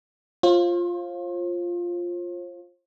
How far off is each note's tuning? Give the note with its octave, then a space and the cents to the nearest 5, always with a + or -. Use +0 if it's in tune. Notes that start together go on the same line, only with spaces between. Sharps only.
F4 +0 C5 +40